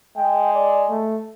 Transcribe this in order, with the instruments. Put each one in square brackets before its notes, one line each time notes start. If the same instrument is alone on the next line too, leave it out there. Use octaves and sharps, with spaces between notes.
[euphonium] G#3 [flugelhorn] G5
[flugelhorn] D5
A3